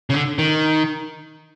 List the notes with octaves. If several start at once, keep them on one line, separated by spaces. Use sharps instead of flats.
C#3
D3
D#3